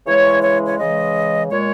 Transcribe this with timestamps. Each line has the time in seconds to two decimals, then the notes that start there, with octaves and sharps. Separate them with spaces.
0.06 C#3 E3 G#3 C#5
0.43 C#5
0.67 C#5
0.79 C#3 E3 G#3 D#5
1.50 A#2 G#3 C#5